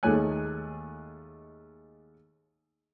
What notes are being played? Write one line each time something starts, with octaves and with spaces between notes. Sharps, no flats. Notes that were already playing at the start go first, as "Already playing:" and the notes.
D#2 G#3 A3 C#5 G#5 F#6